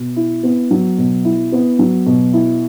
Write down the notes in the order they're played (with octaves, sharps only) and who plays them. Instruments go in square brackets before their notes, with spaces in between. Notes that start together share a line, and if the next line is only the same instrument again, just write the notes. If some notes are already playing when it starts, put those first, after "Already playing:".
Already playing: [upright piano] B2
E4
B3
F#3
B2
E4
B3
F#3
B2
E4